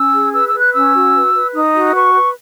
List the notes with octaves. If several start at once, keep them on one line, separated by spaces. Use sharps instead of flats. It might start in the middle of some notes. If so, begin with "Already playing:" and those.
Already playing: C#4 E6
G#4
B4 E6
E6
B4
F#6
C#4 E6
F#4
B4
B4
D#4 D#6
F#4
B4 C#6
B4